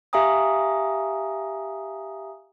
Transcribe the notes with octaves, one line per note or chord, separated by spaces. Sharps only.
G4 E5 F5 G#5 A#5 D#6